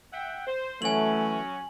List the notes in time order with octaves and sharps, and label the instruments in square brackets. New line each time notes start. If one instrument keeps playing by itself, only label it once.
[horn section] E5 F#5 G5
C5
[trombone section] E3 A3 [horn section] F#3 C#4 [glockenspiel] G#5 F#7